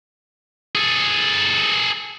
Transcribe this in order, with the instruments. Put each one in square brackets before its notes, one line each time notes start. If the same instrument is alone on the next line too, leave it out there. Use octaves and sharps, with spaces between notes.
[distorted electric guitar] G#4 A4